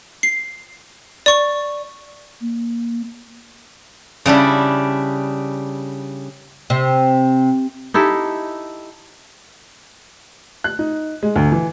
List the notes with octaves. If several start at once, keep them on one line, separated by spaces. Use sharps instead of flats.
C7
D5 C#6
A#3
C#3 G3 D4 E4
C3
D#4 E4 G4 A4
F#6
D#4
G#3
D2
E3